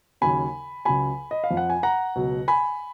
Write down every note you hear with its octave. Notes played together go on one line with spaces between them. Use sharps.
D#2 C#3 F#3 G#5 B5
C#2 C#3 F#3 G#5 B5
D#5
F5
F2 F3
F#5
G#5
F#5 A#5
C#2 B2 F#3
G#5 B5